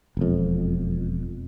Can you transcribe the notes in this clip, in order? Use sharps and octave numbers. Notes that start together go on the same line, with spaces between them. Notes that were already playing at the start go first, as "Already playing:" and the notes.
E1 F2